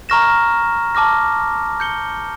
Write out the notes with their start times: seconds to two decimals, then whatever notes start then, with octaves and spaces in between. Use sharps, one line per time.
0.09 A#5 C#6 F6 A#6 E7
0.95 A5 D6 F6 A#6
1.80 G6 C#7 G7